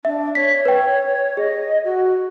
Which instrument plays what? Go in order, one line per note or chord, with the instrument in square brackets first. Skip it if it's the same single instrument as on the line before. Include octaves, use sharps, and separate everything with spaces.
[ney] D4 [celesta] E5
[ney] C#5 [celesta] B6
[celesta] B4 G5
[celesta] G#4 [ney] D#5
[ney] F#4